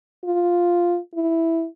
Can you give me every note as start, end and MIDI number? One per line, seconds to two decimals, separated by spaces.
0.24 0.98 65
1.15 1.67 64